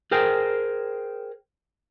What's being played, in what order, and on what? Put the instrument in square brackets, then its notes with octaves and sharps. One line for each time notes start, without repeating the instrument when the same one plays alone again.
[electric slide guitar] G#4 A#4 C5 G5